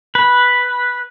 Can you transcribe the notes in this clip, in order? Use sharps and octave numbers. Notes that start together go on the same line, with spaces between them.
B4